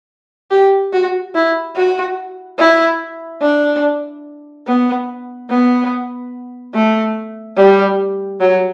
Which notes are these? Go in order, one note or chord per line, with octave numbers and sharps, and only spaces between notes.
G4
F#4
E4
F#4
E4
D4
B3
B3
A3
G3
F#3